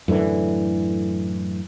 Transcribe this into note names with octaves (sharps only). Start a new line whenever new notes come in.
F#2 A2 D3 E3